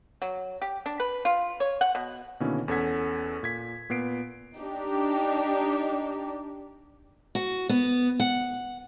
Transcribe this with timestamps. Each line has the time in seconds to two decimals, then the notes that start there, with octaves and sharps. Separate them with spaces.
0.22 F#3
0.62 G4
0.86 D4
1.00 B4
1.25 F4
1.60 C#5
1.81 F#5
1.95 B2
2.40 B2 D3 D#3 A#3 C#4 E4
2.68 E2 C#4 A4 F#5 G#6 B6
3.43 A#2 G#6 B6
3.90 A#2 B3 C7 D7
4.59 D4 D#4 G4
7.35 F#4
7.69 B3
8.20 F#5